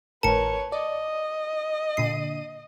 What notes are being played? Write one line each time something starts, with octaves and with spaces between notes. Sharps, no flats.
G#1 A2 A#4 B4 C#5 A5 C#7
D5 D#5
A#2 D3 C7 D#7